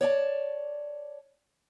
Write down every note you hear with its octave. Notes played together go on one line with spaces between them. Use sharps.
C#5 D5 E5 A5